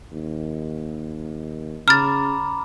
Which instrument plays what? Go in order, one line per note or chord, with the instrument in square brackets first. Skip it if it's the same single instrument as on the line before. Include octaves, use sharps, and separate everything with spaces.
[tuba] D#2
[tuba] C#3 [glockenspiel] A#5 B5 D6 [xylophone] F6 A6